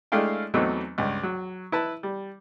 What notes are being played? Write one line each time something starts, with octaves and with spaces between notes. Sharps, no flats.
G#3 A3 D4 E4 F5 G5
E2 E3 F#3 A3 C4 D#4
C#2 G2
F#3
E4 B4 A5
G3